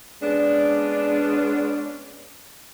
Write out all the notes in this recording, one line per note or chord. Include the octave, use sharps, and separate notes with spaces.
G#3 B3 C#4 D4